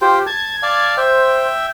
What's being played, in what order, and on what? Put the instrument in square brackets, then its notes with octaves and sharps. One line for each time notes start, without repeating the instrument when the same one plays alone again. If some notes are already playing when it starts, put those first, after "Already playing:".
[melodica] F4 C5 G5 [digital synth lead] G4
[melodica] A5 [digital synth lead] G#6
[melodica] D5 F5 A5
[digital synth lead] C5 [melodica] E5 G5